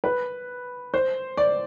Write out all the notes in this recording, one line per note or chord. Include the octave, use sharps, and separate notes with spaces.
B4
C5
D5